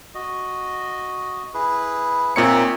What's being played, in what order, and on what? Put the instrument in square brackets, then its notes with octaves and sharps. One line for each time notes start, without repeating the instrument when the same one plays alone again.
[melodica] F#4 D#5
E4 G#4 B4
[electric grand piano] A#2 C4 C#7 [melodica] D#4 C#5 E5